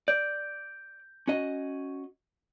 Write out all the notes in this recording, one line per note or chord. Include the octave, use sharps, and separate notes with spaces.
D5 G6
C#4 F#4 D#5